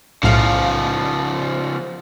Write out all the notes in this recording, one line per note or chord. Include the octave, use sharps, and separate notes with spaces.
B1 A2 C#3 F3 F5